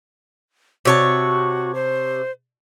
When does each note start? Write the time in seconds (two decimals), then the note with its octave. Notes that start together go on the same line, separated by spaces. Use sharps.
0.85 C3 F#4 C#5 A5
1.75 C5